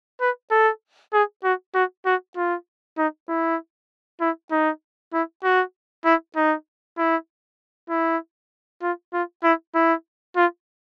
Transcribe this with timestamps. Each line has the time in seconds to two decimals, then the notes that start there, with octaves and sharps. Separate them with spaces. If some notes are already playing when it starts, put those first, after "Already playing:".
0.21 B4
0.51 A4
1.13 G#4
1.44 F#4
1.75 F#4
2.06 F#4
2.37 F4
2.98 D#4
3.29 E4
4.21 E4
4.51 D#4
5.13 E4
5.44 F#4
6.05 E4
6.36 D#4
6.97 E4
7.89 E4
8.82 F4
9.13 F4
9.44 E4
9.75 E4
10.36 F4